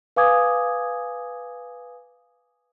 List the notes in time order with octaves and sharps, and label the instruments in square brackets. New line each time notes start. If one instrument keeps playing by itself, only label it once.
[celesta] B4 F5 G#5 D6 D#6 G#6